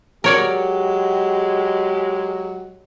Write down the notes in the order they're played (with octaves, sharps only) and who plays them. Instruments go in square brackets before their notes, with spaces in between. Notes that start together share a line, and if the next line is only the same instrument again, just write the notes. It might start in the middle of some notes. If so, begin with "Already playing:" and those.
[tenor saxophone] F#3 [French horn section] G#3 G4 [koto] A#4 C#5 D5